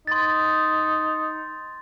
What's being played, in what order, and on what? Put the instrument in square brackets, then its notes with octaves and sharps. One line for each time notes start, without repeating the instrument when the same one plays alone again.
[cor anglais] D#4 [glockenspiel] C6 A6